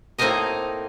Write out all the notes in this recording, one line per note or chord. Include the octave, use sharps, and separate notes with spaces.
A2 A#3 C4 D#4 A#4 D#5